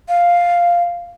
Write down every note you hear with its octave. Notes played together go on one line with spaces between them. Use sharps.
F5